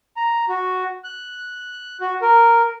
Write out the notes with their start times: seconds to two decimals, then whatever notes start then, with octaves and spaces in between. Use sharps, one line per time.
0.17 A#5
0.49 F#4
1.04 F#6
2.01 F#4
2.22 A#4